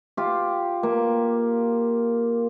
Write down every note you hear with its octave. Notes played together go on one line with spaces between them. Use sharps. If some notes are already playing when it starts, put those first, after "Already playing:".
F4 G4
A#3